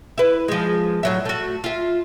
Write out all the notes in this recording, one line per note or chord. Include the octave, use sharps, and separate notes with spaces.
E4 B4
F3 G#3
A2 F#3 E5
A3 F#4
F4 E5